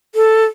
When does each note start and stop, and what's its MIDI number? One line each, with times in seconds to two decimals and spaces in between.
0.15 0.45 69